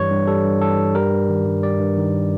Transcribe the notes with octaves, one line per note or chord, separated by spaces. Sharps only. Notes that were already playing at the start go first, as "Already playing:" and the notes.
Already playing: G2 E3 G3 C#5
G2
G3 A4
G2
E3 A4
G2
G3 A#4
G2
D#3
G2
G3 D5
G2
D#3